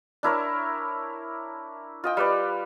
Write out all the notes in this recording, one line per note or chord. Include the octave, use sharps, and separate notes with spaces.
D4 E4 A#4 C#5
F4 D#5 G5
G3 B4 D5